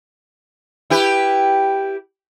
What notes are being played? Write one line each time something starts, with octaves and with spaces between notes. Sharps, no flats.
E4 G4 B4